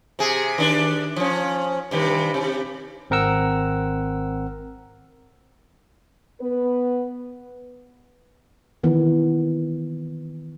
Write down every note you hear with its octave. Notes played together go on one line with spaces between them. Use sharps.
C3 G#4
D#3 D4
F3 C#4
G2 C3 D#3
C3
G#1 C4 A#4 F#5 E6
B3 B4
D#3 E3 B3